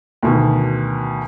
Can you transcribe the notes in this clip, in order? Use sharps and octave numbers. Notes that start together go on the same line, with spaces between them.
D2 B2 D#3